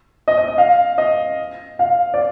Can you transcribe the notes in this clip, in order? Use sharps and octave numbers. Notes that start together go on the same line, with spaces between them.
D#5
D#5
D#5
F5
D#5
F5
D5